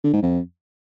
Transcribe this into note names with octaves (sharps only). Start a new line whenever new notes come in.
D3
G#2
F2